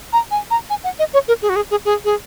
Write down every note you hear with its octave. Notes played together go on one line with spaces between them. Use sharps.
A#5
G#5
A#5
G#5
F#5
D#5
C#5
A#4
G#4
F#4
G#4
G#4
G#4
G#4